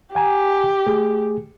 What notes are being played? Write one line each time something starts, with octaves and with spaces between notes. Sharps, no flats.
G4 F#5 G#5 A#5
A3 G#4